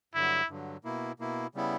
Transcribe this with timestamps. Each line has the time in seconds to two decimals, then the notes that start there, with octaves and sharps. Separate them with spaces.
0.14 G2 D3 F#3 E4
0.49 G2 D3 F#3
0.84 B2 A#3 E4
1.19 B2 A#3 E4
1.55 C#3 G3 B3 E4